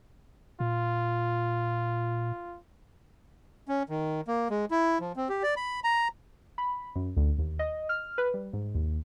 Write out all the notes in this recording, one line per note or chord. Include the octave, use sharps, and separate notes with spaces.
A#2 F4
C#4
D#3
A#3
G#3
E4
F3
C4
G4
D5
B5
A#5
B5
F#2
D2
D#2
D#5
F6
B4
G3
G#2
D#2